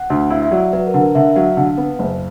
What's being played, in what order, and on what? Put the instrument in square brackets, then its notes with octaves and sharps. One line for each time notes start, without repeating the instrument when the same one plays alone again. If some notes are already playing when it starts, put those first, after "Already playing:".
Already playing: [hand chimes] F#5
[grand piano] D2
[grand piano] E4 [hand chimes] F5
[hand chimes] E5
[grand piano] F#3 [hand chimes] D5
[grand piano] F#3 [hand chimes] B4
[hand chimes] A#4
[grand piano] D3
[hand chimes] A#4
[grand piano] D3 [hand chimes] E5
[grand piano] F#3 [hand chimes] F5
[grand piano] D3
B3
F#1